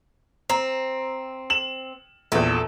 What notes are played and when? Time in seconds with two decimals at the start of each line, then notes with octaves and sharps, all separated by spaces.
0.50 C4 A#5
1.50 E7 F#7
2.32 A#1 E2 A4